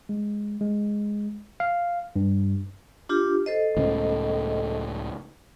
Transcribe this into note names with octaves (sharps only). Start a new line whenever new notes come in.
G#3
G#3
F5
G2
D4 F4 G4
A4 C5 D#5
C#2 A2 C#3